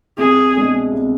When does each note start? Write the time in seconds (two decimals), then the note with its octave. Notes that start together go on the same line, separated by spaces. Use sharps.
0.18 C2 G#4
0.56 B2 G#3 D4
0.92 C2